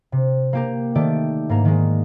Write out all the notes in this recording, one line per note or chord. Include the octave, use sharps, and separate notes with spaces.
C3
A#3 G4 A#4
D#3 A3 G4 D5
G#2 A#3 A#4
D#3 G#3